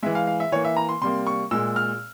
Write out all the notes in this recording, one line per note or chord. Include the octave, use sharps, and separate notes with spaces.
E3 G#3 E5
F5
F5
E5
E3 A#3 C#5
E5
A#5
C6
C3 G3 A#3 C6
C#6
A#2 G#3 E6
F6